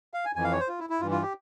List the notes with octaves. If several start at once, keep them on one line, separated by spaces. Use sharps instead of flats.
F5
G#5
F2 E3 G#5
F5
C#5
C5
F4
E4
E4
G2 E3 F4
F4
G4